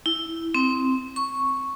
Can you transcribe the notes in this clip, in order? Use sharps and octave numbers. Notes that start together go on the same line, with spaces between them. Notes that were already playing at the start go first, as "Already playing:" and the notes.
E4
C4
C#6